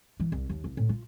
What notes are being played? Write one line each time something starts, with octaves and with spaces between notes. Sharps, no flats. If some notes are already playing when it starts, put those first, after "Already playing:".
E3
C2
D#2
C2
A2
F4